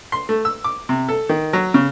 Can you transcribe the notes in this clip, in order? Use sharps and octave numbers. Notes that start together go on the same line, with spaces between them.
C6
A3
E6
D6
C3
A4
D#3
F#3
C#3